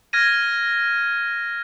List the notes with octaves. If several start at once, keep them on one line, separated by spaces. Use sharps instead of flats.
F6 G#6 A#6 D#7